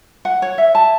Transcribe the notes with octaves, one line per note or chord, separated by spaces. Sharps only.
F#5
C#5
E5
A5